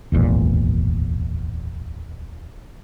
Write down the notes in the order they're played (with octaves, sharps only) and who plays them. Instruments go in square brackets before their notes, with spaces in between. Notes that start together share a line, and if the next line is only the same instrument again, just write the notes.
[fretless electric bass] D1 G#1 E2 A#2